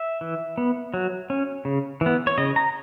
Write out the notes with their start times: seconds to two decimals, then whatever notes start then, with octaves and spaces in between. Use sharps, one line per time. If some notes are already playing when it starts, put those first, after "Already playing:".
Already playing: E5
0.21 E3
0.58 B3
0.94 F#3
1.30 C#4
1.65 C#3
2.01 E3
2.06 B3
2.27 C#5
2.38 C#3 D#5
2.56 A#5